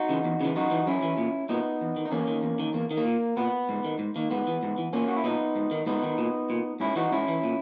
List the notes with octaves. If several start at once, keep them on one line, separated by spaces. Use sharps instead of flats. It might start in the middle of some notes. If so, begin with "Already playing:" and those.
Already playing: D#4 F#4
C#3 E3
E2
C#3 E3
F#2 D#4 F#4
E3
F#2 C#4 E4
E3
A#2
A#2 B3 D#4
E2
D#3
D#4
E2 A#3 C#4
D#3
E2
D#3
E2 A#3
D#3
A#3
A#2
A#2 B3
G#2
D#3
G#2
D#3 A#3
G#2 B3
E3
G#2
E3
A#2 A#3 C#4
F#4
E4
A#2 B3 D#4
G#2
D#3
G#2 B3 D#4
D#3
A#2
A#2
G#2 C#4 E4
E3 D#4 F#4
G#2 C#4 E4
E3
A#2